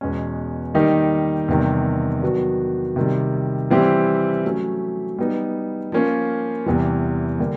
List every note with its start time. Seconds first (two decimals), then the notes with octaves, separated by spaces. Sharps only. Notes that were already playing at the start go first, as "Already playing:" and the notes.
0.01 E2 B2 G#3 C#4
0.74 D#3 G3 A#3 D#4 G4
1.48 E2 C3 D#3 G3
2.23 D#3 F#3 B3 D4 F#4
2.96 C3 D#3 G3
3.70 E3 G3 C4 E4 G4
4.45 F#3 A3 C#4
5.18 G3 B3 D#4
5.92 F3 A#3 C#4 F4
6.66 E2 C3 E3 G3
7.40 D3 G3 A#3